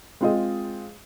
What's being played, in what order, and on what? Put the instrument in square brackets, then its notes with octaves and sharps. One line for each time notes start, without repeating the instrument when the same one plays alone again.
[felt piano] G#3 C4 F4 G#4 D#5